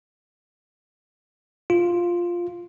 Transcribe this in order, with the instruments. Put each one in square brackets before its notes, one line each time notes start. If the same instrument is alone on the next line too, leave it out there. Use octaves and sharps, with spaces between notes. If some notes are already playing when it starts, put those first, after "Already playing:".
[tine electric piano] F4